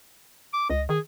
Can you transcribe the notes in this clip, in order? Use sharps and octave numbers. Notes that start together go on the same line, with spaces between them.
D6
C#2 D#5
D#3 G#4